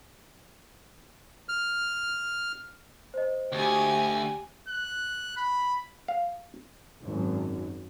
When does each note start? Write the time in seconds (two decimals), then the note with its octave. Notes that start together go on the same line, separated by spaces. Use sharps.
1.49 F6
3.14 C5 D#5
3.52 D2 G4 G#5
4.68 F#6
5.37 B5
6.08 F5
7.02 G#1 F#2